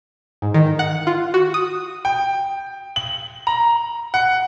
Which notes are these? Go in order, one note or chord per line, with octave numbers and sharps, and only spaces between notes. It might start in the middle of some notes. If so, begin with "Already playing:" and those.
G#2
D#3
F#5
F4
F#4
D#6
G5
F#7
A#5
F#5